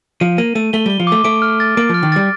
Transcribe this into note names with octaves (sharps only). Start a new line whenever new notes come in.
F3 D#7
A#3 D#7
A3 D#7
A3 G7
G3 G7
F3
A3 D6
A3 D7
F6
A6
A#3 D7
F3 F6
D#3
G3 A6